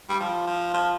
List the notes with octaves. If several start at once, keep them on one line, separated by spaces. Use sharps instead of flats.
G3
F3
F3
F3